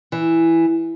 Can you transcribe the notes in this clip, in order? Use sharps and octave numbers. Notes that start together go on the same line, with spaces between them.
E3